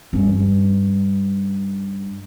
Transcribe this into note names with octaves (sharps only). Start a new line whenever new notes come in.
G2 C#4